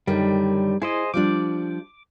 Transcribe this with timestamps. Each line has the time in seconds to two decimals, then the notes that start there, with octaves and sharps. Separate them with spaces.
0.07 F#2 D3 D#3 G3
0.82 E4 G#4 C5 D#5
1.14 F3 G3 D4 D6